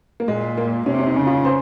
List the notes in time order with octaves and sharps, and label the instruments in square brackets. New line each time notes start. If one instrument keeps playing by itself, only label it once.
[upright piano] A#3
[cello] A#2 [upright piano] G#3
[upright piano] A#3
[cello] C3 [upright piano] C#4
[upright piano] C#4
D#4
[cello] C#3
[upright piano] F4
C5